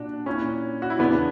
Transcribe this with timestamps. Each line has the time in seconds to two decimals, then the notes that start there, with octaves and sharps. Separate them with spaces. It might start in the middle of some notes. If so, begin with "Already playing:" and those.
Already playing: A#2 D4 F#4
0.26 A#2 C#4 E4
0.82 F#4
0.90 E4
0.99 E2 C#3 E3 B3 D4